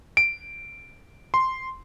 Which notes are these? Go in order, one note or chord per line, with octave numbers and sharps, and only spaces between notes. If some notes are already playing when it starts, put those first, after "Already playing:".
D7
C6